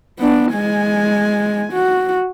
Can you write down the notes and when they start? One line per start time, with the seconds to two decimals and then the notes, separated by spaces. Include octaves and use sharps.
0.20 B3 D4
0.54 G#3 G#5
1.73 F#4